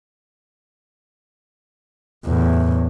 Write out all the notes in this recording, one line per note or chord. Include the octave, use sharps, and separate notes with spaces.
E2 A2